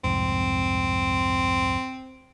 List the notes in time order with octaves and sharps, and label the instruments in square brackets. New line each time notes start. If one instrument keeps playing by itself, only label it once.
[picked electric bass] C2 F2 G#2 [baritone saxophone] C4